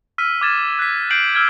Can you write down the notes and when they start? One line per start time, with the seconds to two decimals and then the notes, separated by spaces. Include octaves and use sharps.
0.18 E6 F6 B6 D#7
0.41 D6 F6 G#6 A6 E7
0.79 F#6 B6
1.11 G6 C7 D7 F#7
1.34 E6 F6 G#6 D7